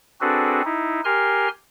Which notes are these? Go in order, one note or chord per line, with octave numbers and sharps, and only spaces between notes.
C4 D4 F#4 G#4 A4 B4
D#4 E4
G4 A#4 G#5 C6 F6